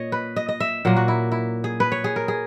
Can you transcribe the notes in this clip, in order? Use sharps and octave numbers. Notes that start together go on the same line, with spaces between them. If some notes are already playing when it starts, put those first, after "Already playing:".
Already playing: A#2 C#5 D#5
B4
D#5
D#5
E5
A#2 F#3 A#3
F#4
E4
E4
G#4
B4
C#5
G#4
A#4
G#4